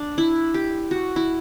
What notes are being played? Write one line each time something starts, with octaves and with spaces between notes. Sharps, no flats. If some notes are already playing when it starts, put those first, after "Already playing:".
Already playing: D4
E4
G4
F#4
E4